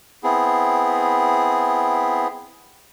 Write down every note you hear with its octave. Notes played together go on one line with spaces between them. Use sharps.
B3 C4 E4 G#4